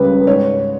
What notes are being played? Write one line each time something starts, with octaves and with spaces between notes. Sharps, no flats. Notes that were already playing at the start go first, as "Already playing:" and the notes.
Already playing: C#2 C#3 G3 B4
G#2 C#5